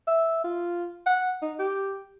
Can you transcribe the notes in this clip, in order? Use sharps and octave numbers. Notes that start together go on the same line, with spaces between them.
E5
F4
F#5
D#4
G4